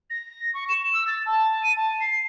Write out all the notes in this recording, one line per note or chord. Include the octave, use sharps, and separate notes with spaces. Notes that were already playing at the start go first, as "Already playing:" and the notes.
A#6
C#6
E7
E6
A6
A5
D#7
A5
C7